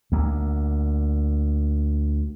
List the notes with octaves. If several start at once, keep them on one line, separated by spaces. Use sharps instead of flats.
D2 A#3